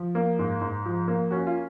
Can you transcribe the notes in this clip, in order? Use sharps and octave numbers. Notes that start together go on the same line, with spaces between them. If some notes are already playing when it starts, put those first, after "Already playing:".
Already playing: F3
A#3
G#2
G#2
F3
A#3
C#4 F#4
F4